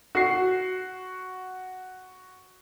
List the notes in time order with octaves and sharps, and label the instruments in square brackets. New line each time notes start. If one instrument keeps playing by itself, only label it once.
[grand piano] F#4 C7